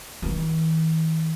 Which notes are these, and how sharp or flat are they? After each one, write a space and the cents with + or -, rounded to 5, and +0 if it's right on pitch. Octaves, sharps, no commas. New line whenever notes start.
E3 -45